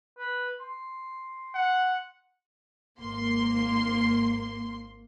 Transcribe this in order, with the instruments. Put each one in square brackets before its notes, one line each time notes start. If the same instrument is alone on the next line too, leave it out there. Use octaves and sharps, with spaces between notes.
[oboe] B4
C6
[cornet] F#5
[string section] G#1 A#3 C6